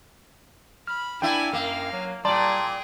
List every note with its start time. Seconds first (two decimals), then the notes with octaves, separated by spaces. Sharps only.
0.87 B5 F6
1.22 A#3 D4 E4 G5 G#5
1.53 F#2 A#3 F5
1.93 F#3
2.25 A#2 G3 G#4 D5 G5 A5 A#5 C6